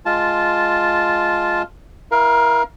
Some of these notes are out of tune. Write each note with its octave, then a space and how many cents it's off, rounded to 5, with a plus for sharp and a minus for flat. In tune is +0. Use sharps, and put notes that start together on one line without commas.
G#3 +0 F4 +0 A5 -10
E4 +0 A#4 +30 F5 +0